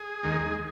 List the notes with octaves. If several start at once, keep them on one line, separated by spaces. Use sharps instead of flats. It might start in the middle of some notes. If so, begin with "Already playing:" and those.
Already playing: G#4
D#2 D#3 G#3